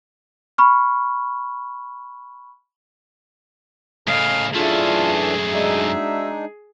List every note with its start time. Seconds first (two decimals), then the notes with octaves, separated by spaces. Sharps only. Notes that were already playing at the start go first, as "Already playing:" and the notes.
0.58 B5 C#6 F6
4.07 A2 C#3 A4 D#5 F5 G#5
4.55 F#2 E3 A3 D4 F4 G#4 A4
5.51 G#3 D4 D#4 F#4 E5